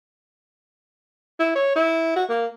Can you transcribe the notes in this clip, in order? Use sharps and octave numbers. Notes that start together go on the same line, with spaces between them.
E4
C#5
E4
F#4
A#3